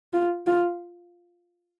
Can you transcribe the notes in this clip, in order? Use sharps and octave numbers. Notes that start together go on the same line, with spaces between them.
F4
F4